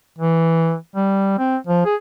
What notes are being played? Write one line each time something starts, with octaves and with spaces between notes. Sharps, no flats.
E3
G3
C4
F3
G#4